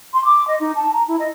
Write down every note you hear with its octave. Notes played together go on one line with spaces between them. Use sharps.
C6
D6
D#5
D#4
A5
A#5
E4
D#5